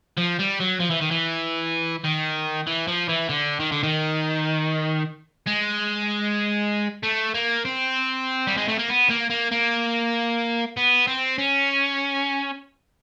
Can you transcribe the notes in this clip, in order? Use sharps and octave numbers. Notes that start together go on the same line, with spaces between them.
F3
G3
F#3
F3
E3
D#3
E3
D#3
E3
F3
E3
D3
D#3
D3
D#3
G#3
A3
A#3
C4
G3
G#3
A3
A#3
B3
A#3
A#3
A#3
B3
C4
C#4